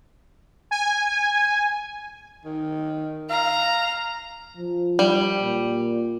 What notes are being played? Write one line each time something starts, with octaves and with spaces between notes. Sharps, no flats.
G#5
D#3
F5 A#5
F3
G3
A#2